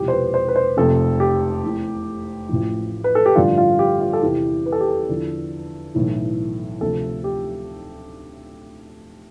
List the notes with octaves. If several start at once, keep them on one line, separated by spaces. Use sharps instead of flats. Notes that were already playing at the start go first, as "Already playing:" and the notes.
Already playing: E1 E2 C3 F3 G4
C5
B4
C5
B4
C5
F1 F2 C3 A4
G4
F1 E2 C3
A1 A2 F3
B4
A4
G4
A1 G2 D3 F3 F4
F4
G4
F4
A4
E2 C3 E3 G4
B4
A4
G4
A4
E2 D3 F3
B1 A2 E3
D2 C3 F3 A4
G4